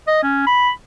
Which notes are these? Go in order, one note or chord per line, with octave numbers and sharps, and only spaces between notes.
D#5
C#4
B5